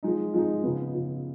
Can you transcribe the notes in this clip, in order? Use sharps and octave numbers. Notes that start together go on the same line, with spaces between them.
F3 G#3 D#4
F3 G#3 D#4
C#3 F3 B3
C#3 F3 B3